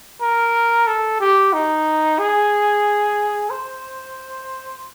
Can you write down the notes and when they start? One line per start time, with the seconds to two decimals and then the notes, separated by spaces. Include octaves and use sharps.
0.22 A#4
0.87 A4
1.20 G4
1.53 D#4
2.19 G#4
3.50 C5